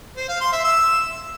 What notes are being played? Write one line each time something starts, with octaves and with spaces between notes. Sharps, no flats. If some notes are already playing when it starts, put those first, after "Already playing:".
C5
F5
C6
E5
E6